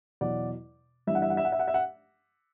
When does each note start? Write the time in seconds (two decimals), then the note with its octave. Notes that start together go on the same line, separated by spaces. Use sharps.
0.21 E2 B2 F#3 D5 F#5
1.07 G1 G2 E3 G3 E5
1.15 F#5
1.22 E5
1.30 F#5
1.37 E5
1.45 F#5
1.52 E5
1.59 F#5
1.68 E5
1.74 F#5